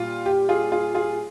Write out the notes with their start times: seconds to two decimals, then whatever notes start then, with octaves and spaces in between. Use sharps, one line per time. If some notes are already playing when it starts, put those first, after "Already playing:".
Already playing: A#2 G3 F4
0.26 G4
0.49 F4 G#4
0.72 F4 G#4
0.94 F4 G#4